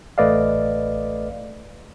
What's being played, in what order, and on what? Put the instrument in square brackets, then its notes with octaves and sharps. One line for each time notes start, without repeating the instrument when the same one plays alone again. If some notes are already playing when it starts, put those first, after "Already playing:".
[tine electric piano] A1 A3 B4 D5 D#5 F5